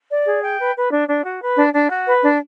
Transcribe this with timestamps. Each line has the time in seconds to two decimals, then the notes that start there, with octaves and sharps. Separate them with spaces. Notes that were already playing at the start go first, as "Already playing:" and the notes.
0.10 D5
0.25 G#4
0.42 G5
0.59 B4
0.75 B4
0.92 D4
1.08 D4
1.24 F#4
1.42 B4
1.57 D4
1.74 D4
1.90 F#4
2.06 B4
2.23 D4